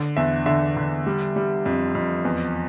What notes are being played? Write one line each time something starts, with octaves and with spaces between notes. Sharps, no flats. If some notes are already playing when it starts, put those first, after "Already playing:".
Already playing: D3
E2 E5
D3 E5
D3
G3
G3
F2
F2
E2